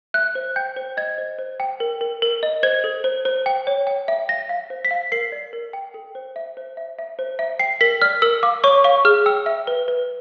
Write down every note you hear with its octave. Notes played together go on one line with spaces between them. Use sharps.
E5 F#6
C5
G5 G6
C5
D#5 G#6
C5
C5
G5
A#4
A#4
A#4
D#5
C5 G#6
A4
C5
C5
G5
C#5
G5
E5
F5 A#6
F5
C5
B6
F5
A#4 C7
D5
A#4
G5
A4
C5
E5
C5
E5
E5
C5
E5
G5 C7
A#4 B6
D5 F6
A#4 E6
F5 D6
C#5 C#6
F5 C#6
G#4 F6
G5 E6
E5
B4
B4